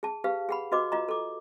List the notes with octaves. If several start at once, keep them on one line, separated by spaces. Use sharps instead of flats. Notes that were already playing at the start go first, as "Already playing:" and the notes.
G#4 A5
G4 B4 F5
G#4 F#5 B5
F#4 B4 D#5 D6
F4 D#5 A#5
A4 D6